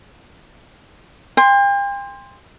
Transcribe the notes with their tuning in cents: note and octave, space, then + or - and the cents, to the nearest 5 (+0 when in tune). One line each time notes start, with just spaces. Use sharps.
G5 +40 C6 +0